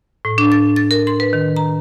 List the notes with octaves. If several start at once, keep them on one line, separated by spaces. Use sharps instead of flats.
A2
D4
A6
A6
A#4
C6
B4
D#3
A#5